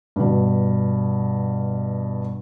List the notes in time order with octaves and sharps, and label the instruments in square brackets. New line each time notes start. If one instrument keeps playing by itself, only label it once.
[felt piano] G2 B2